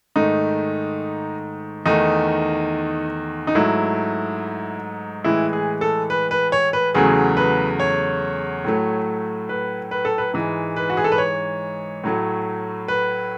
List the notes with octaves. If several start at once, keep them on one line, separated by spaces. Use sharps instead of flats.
G#2 D#3 A3 D#4
E2 D#3 A3 D#4
D#4
G#2 F#3 A3 E4
A2 E3 G#3 E4
G#4
A4
B4
B4
C#5
B4
E2 C#3 F#3 A3 G#4
B4
C#5
A2 F#3 A3
B4
B4
A4
B4
G#2 E3 G#3
B4
F#4
G#4
A4
B4
C#5
A2 F#3 A3
B4